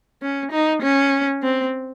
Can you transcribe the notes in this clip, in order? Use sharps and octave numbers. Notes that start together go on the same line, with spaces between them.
C#4
D#4
C#4
C4